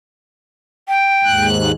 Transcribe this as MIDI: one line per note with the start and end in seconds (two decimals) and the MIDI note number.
0.88 1.47 79
1.23 1.71 39
1.23 1.71 44
1.23 1.71 90